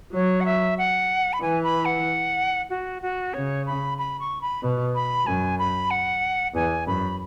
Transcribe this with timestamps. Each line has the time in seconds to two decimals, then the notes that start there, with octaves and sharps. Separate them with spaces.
0.13 F#3 C#5
0.40 F#5
0.45 E5
0.78 F#5
1.33 B5
1.42 E3 G#5
1.63 B5
1.85 F#5
2.70 F#4
3.02 F#4
3.34 C#3 C#5
3.66 B5
3.98 B5
4.20 C#6
4.41 B5
4.62 B2
4.95 B5
5.26 F#2 G#5
5.59 B5
5.90 F#5
6.54 E2 G#5
6.87 F#2 B5